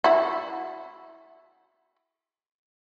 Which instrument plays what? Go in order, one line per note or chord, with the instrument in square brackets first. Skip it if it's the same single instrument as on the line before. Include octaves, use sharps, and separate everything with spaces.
[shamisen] E4 F#4